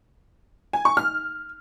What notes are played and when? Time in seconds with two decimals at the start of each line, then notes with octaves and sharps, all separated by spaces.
0.73 G#5
0.85 C#6
0.97 F6